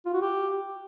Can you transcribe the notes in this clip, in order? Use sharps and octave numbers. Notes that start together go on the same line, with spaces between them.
F4
F#4
G4